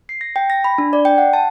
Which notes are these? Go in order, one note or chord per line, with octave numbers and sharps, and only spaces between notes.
C7
A#6
G5
A#6
B5
D4
D5
G5
F#5
A5